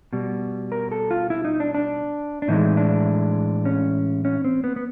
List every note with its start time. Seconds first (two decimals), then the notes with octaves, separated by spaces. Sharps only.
0.13 B2 G3
0.72 A#4
0.92 A4
1.11 F4
1.30 E4
1.45 D#4
1.60 D4
1.75 D4
2.42 D4
2.48 A2 E3 G#3 D#4
2.77 D4
3.65 C#4
4.25 C#4
4.44 C4
4.64 B3
4.76 B3